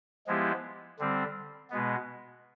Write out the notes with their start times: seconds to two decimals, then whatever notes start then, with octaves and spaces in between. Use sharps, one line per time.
0.27 F3 G#3 B3 E4 G4
0.99 D3 G3 C4
1.70 B2 G#3 B3